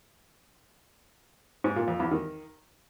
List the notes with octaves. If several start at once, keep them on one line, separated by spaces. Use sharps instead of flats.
G#2
A#2
F2
E2
D#3